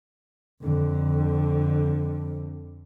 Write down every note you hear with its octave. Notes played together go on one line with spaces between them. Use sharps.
F2 D3